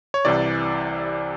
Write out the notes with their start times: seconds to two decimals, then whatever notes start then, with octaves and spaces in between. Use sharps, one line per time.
0.14 C#5
0.25 C2 C3 E3 D5